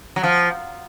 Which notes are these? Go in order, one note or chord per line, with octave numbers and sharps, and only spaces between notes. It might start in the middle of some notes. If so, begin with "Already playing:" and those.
F#3
F3